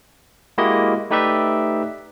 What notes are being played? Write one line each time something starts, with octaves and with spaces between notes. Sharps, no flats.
G#3 A#3 E4 F#4 G4 D#5
A3 D#4 G4 B4 D5 E5